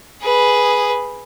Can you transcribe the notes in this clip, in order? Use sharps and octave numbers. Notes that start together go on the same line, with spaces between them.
G#4 B4